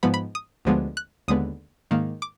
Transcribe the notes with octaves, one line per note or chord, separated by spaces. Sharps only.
G#2 F3 G#3 B3 B5
B5
D#6
D2 D3 F3 G#3 B3
F#6
D#2 D3 G#3 B3 D#6
G#2 D#3 A#3
D6